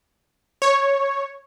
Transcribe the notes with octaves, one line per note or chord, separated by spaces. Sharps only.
C#5